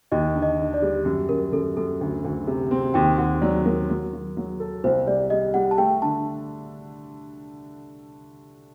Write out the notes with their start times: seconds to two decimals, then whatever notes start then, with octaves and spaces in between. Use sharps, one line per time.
0.12 D#2 D#5
0.35 D3
0.42 D#5
0.59 D3
0.74 D5
0.82 G3
1.05 F#2
1.29 F#2 A#4
1.52 F#2 A4
1.77 F#2 A4
2.01 D2
2.24 D2
2.47 C3
2.71 C4
2.94 D#2 G5
3.18 D#2 F#5
3.41 F#3 D5
3.66 F#3 A#4
3.90 F#3
4.13 F#3
4.37 F#3
4.60 A4
4.84 C2 C5
5.07 G3 D5
5.30 G3 D#5
5.54 G3 F#5
5.71 A5
5.77 A3 G5
6.02 D3 A5